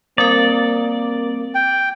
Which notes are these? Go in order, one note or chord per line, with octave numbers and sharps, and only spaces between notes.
G3 A#3 C4 A#4 D5
G5